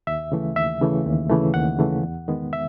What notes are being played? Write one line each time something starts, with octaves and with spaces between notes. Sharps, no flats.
D#2 E5
C#3 E3 A3
D#2 E5
C#3 E3 A3
D#2
C#3 E3 A3
D#2 F#5
C#3 E3 A3
E2
D#3 G#3 B3
E5